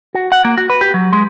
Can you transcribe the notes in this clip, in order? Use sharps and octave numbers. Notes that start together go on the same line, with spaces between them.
F#4
F#5
A#3
F#4
B4
G4
F#3
G#3